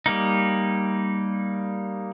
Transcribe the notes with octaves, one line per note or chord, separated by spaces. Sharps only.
G3 A#3 D#4